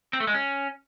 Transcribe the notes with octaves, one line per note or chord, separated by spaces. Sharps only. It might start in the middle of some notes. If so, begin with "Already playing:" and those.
C4
A3
G#3
C#4